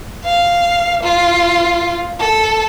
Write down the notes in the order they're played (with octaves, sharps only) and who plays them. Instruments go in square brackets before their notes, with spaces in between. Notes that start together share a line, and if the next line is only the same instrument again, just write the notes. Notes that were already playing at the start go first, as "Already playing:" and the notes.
[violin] F5
F4
A4